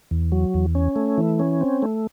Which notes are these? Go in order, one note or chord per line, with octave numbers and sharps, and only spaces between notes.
E2
F#3
E2
C#4
A3
E3
C#4
C4
A3